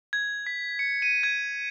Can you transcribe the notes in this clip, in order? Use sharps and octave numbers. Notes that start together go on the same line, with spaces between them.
G#6
B6
C#7
D#7
G#6